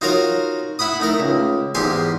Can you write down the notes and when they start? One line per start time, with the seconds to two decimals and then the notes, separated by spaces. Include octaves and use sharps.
0.01 D#4 F4 F#4 A#4 C#5 F5
0.79 E4 F#5 B5 D#6
1.00 A3 D#4 A#4
1.20 C#2
1.75 E2 G#2 G4 G#5 C6